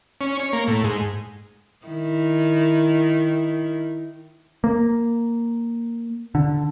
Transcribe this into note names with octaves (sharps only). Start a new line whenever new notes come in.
C#4
C#5
A#3
A2
G#2
D#3 E4
A#3
D3